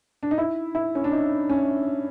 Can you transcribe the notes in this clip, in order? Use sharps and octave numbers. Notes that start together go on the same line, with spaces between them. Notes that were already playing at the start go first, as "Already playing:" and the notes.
D4
D#4
E4
E4
C#4
D4
D#4
C#4